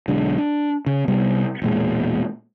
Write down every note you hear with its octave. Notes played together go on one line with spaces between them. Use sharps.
B1 D3 G#3 D4
D4
C#3
C3 G3 B3
E1 A#2 G#3